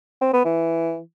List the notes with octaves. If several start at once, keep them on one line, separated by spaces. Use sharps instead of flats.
C4
B3
E3